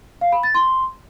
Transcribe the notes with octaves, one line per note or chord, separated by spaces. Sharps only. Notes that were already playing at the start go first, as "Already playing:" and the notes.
F5
B5
A6
C6